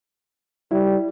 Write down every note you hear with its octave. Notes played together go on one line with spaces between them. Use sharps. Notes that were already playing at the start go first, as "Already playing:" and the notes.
G3 E4